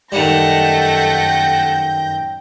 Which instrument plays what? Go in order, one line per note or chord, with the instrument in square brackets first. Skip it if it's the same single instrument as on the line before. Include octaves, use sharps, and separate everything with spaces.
[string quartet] F#2 G6 A#6 [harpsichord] D#3 G3 [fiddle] A3 F#5 [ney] G5